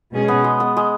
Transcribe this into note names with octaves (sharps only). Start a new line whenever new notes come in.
B2 G#3 C#4 G#4
B3
G#3
B3
G#3